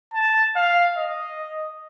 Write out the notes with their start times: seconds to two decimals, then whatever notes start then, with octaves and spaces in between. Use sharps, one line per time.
0.14 A5
0.56 F5
0.97 D#5